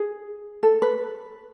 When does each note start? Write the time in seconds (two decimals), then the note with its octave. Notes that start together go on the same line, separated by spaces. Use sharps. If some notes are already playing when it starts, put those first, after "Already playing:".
Already playing: G#4
0.63 A4
0.82 B4